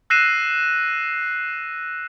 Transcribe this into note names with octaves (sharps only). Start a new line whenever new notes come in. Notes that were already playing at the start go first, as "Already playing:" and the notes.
E6 F#6 A#6 C7 D#7 E7